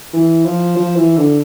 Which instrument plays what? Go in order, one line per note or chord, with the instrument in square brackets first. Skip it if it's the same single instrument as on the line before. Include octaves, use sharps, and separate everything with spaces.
[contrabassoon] E3
F3
F3
E3
D3